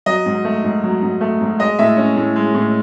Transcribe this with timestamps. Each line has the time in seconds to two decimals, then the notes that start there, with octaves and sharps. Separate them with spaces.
0.06 F#3 D#5
0.26 G#2
0.45 A3
0.64 G#2
0.84 F#3
1.03 G#2
1.21 A3
1.41 G#2
1.59 G#3 D#5
1.79 A2 E5
1.97 C#4
2.17 A2
2.36 G#3
2.54 A2